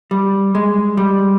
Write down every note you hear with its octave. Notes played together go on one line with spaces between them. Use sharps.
G3
G#3
G3